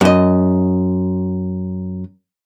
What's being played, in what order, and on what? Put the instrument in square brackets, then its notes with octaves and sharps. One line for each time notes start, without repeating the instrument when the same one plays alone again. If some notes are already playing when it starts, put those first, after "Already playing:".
[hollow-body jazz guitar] F#2 D#5